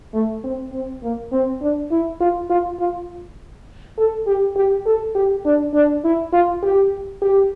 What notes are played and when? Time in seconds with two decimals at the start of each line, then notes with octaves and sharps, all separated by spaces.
0.14 A3
0.44 C4
0.72 C4
1.02 A#3
1.32 C4
1.62 D4
1.91 E4
2.20 F4
2.50 F4
2.79 F4
3.98 A4
4.27 G4
4.56 G4
4.86 A4
5.15 G4
5.45 D4
5.74 D4
6.04 E4
6.33 F4
6.63 G4
7.22 G4